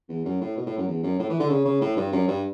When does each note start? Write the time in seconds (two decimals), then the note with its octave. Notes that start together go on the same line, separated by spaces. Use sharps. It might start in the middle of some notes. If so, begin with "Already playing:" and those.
0.09 E2
0.25 F#2
0.41 A2
0.57 B2
0.66 A2
0.77 F#2
0.87 E2
1.03 F#2
1.19 A2
1.29 E3
1.39 D3
1.50 C#3
1.65 C#3
1.81 A2
1.97 G2
2.12 F#2
2.27 G2